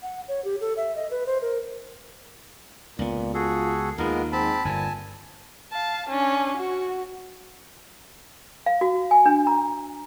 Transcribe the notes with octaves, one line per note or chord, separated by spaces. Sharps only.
F#5
C#5
G4
A4
E5
D#5
B4
C5
A#4
C#2 A#2 B3
F4 F#4 G#4 A4
D#2 D#3 G#3 B3 F4 A#4
G#2 C4 A5 B5
G1 G2 A#2 G#5 A5
F5 A5
C#4 D4
F#4
F5
F#4
G#5
D4
A#5